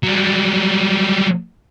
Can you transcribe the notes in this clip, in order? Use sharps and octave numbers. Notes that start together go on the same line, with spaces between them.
F#3 G3